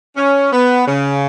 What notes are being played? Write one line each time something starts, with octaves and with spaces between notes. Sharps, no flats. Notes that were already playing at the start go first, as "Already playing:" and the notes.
C#4
B3
C#3